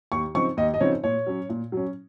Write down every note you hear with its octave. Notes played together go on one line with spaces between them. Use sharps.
D#2 C#6
C#3 F3 C4 D#4 C#6
D#2 D#5
D#5
C#3 F3 C4 D#4 C#5
A#2 C#5
F#3 C#4
A#2
F#3 C#4